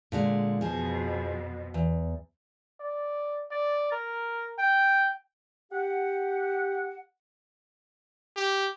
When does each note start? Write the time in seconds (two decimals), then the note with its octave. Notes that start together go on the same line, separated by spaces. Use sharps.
0.12 A#2 D3 G#3
0.61 F2 B2 F3 G#4
1.74 E2
2.80 D5
3.51 D5
3.92 A#4
4.58 G5
5.72 G4 F#5
8.36 G4